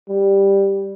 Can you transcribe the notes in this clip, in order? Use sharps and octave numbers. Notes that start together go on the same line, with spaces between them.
G3